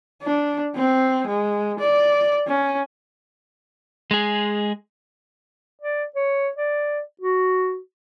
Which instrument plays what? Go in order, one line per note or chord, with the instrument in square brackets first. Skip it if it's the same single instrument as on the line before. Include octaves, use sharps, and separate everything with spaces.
[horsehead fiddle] D4
C4
G#3
D5
C#4
[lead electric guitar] G#3 G#4
[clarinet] D5
C#5
D5
F#4